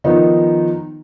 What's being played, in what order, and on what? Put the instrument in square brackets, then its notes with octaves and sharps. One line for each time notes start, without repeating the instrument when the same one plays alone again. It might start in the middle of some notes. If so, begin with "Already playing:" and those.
[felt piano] D#3 F3 B3 D#4